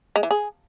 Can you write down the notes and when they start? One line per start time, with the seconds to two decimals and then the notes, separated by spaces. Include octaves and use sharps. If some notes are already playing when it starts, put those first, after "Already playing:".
0.16 G#3
0.23 E3
0.31 G#4